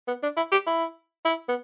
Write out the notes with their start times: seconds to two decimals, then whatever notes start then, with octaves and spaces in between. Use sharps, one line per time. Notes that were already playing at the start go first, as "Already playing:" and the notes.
0.08 B3
0.23 D4
0.37 E4
0.52 G4
0.67 E4
1.25 E4
1.48 B3